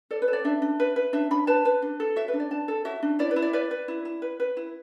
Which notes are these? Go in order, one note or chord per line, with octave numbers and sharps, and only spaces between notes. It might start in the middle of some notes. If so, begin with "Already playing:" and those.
A4 D5
B4
A4
D5
D4 E5
D4
B4
B4
D4 E5
D4 B5
B4 A5
B4
D4
A4
F#4 E5
B4
D4
D5
D4 A5
A4
F#4 E5
D4
E4 D5
B4
E4
D5
B4 D5
B4
E4
E4
B4
B4
E4